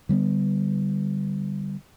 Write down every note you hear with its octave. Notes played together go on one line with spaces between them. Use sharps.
D3 G3 G#3 B3